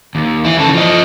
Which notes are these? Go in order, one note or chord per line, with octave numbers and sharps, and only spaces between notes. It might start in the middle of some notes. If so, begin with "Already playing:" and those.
D#2
E3 E4
C#3 A4
F3 D#5